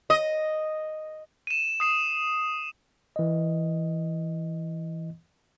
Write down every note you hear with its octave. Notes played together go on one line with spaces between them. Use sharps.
D#5
D#7 E7
D#6 C7 E7
E3 D#5